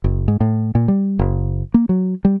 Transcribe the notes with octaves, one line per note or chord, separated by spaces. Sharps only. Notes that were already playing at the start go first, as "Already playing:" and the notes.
F#1
G#2
A2
A#2
G3
F#1
A#3
F#3
G3